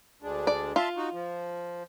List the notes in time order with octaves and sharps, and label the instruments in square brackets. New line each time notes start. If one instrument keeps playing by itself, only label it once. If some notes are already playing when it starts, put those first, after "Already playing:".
[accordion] D2 G#3 D4
[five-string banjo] D5
[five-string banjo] F4 [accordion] E5 A5 C6
[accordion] D#4 F#4
F3